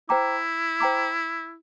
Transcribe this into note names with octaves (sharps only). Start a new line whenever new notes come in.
E4 C5 G5 A#5 D6
C5 G5 A#5 D6